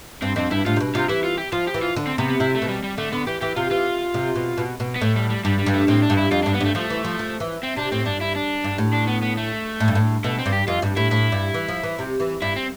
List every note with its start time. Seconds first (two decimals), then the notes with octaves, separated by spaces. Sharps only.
0.22 G2 C4
0.36 F2 C4
0.51 G2 E4
0.66 A2 F4
0.76 C3
0.80 B2
0.95 C3 F4
1.09 E3 E4
1.24 F4
1.38 G4
1.52 F3 F4
1.67 G4
1.74 E3
1.82 F4
1.96 D3
2.07 C4
2.18 C3 B3
2.29 B3
2.40 C3 E4
2.55 A3
2.62 B2
2.68 G3
2.83 G3
2.98 D3 A3
3.12 D3 B3
3.27 E3 G4
3.41 E3 G4
3.56 C3 F4
3.71 E3 F4
4.14 C3
4.36 B2
4.58 B2
4.80 B2
4.96 B3
5.01 A2 A3
5.16 G3
5.30 G3
5.44 G2 G3
5.59 G3
5.66 G2
5.73 A3
5.88 A2 C4
6.02 D4
6.10 G2
6.17 E4
6.31 F2 F4
6.43 D4
6.46 G2
6.54 B3
6.61 G2 A3
6.75 F3 A3
6.90 E3
7.05 F3
7.19 F3
7.40 E3
7.63 C4
7.77 C3 D4
7.92 A2 C4
8.05 G2 D4
8.21 E4
8.35 D4
8.64 G2
8.78 A2
8.93 D4
9.07 B3
9.22 B3
9.37 A3
9.80 A2
9.88 G2
9.95 A2
10.24 B2 A3
10.39 C4
10.46 G2
10.52 G4
10.68 F2 F4
10.82 G2
10.96 A2 E4
11.11 A2 E4
11.32 G2
11.54 E3
11.69 F3
11.83 E3
11.99 C3
12.20 E3
12.42 G2 E4
12.56 C4